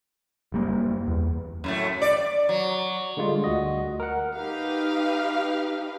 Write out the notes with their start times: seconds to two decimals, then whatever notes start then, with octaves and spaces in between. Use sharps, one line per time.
0.52 F#1 G3 A#3
1.07 E2
1.64 F#2 A2 A3
2.02 D5
2.49 F#3
3.17 D3 G3 G#3 F4
3.44 D2 F#4 D#5
4.00 A#4 F#5
4.36 D#4 G4 B4 F5